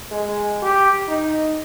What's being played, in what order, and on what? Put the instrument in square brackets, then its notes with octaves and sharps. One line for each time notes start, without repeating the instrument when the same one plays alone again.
[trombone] G#3
G4
D#4